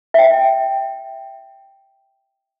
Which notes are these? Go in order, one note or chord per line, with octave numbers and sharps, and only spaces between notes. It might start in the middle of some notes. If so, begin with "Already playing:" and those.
E5 G5